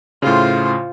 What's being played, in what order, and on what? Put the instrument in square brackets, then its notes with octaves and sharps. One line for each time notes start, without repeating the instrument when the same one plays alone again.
[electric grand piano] A2 C#3 [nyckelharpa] F4 C5